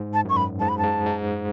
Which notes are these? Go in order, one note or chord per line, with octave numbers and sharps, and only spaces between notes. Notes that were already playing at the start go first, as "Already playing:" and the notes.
Already playing: G#2
A5
F#2 C#6
B5
G#2 A5
B5
A5
G#2
G#2